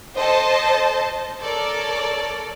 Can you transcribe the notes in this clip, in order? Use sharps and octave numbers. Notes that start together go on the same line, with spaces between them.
A4 C5 D#5 A5
A4 A#4 C#5 D5